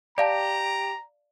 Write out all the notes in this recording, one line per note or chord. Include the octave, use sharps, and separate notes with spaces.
G4 D5 F5 A5 A#5